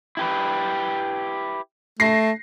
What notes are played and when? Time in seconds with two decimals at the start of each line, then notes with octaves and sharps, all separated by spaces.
0.17 E4 G4 B4
2.00 A3 A#6 C7